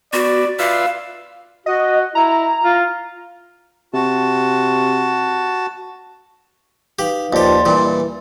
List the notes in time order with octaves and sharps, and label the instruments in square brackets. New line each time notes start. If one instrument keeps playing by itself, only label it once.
[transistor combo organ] B3 [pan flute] F#4 [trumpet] D5
[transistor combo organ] F4 B4 E5 [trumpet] D5 [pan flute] F5
[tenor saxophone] F#4 [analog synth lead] D#5
[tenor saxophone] E4 [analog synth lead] A#5
[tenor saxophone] F4
[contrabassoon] C3 [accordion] F#4 A5
[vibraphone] D#4 B4 F5 [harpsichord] G4
[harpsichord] D#2 G4 [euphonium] F3 [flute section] D5 C6
[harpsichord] G2 A#2 [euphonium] E3 [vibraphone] E4